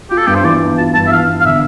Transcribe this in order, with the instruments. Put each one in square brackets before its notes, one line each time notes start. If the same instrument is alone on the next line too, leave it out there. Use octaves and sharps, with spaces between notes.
[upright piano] F4 [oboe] G4
[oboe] A4
[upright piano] G2 [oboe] G4
[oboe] C5
[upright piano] E3 [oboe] D5
[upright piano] B3
[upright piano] F4 [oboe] A5
[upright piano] G2 [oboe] A5
[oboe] E5
[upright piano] E3 [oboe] F5
[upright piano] B3
[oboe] F5
[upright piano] D3 [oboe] E5